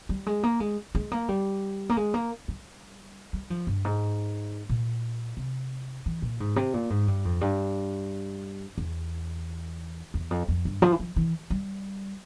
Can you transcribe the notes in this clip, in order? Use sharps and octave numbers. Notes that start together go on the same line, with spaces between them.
G3
G#3
A#3
G#3
G#3
A#3
G3
A#3
G#3
A#3
G3
G3
F3
G2
G#2
A#2
C3
E3
A#2
G#2
C3
A#2
G#2
G2
F2
G2
E2
E2
F2
F2
G2
F3
E3
F3
E3
G3